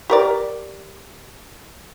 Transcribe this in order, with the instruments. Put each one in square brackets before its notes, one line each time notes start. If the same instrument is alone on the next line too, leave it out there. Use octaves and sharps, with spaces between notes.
[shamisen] G4 A#4 D5